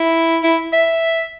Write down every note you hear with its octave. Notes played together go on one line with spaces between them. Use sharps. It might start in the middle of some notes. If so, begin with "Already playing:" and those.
Already playing: E4
E4
E5